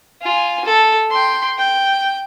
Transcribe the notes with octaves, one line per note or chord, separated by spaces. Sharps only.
F4 G#5
A4
G5 C6
G5